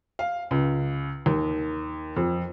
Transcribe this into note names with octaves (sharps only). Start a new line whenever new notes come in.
F5
C#2
D#2
F2